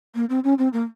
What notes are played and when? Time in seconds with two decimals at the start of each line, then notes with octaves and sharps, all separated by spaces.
0.15 A#3
0.30 C4
0.44 C#4
0.58 C4
0.73 A#3